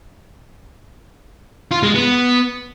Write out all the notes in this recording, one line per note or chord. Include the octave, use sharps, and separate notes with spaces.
F4
G#3
B3